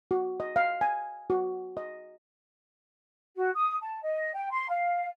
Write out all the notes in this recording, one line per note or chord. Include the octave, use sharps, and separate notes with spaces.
F#4
D#5
F5
G#5
F#4
D#5
F#4
D#6
A5
D#5
G5
C6
F5